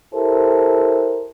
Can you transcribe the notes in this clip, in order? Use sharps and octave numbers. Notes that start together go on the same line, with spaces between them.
E4 G4 A4 A#4 C5